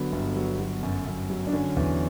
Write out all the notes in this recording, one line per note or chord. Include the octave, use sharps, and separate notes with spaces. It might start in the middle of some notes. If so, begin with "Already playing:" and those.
Already playing: D3 F#3 B3
G1
F#3
F#3
F#2
F#2
F#3
D4
D3 C#4
E2